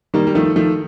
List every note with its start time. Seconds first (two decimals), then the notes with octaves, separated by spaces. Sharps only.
0.14 D#3 G3 A#3
0.27 G3
0.35 D#3 F3 A3
0.56 D#3 F3 A3